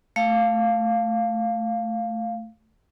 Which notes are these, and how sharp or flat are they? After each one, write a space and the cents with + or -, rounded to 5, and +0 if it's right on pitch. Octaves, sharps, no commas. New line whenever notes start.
A3 +0 F5 +0